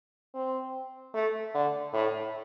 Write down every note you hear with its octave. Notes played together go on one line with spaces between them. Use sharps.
C4
A3
D3
A2